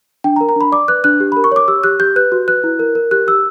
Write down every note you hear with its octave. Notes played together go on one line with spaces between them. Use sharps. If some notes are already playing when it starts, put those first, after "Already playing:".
D4 G5
A#5
A#4
A#5
D4 B5
D5 D6
B4 F#6
D4 F#6
G4
A#4 B5
C#6
C#5 D6
G4 E6
G4 F#6
G4 G6
B4 F#6
F#4
B4 F#6
E4
A#4
A#4
G4 F#6
G4 E6